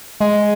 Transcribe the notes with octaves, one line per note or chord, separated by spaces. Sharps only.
G#3